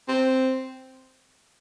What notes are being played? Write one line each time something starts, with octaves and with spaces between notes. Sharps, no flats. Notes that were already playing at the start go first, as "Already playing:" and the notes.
C4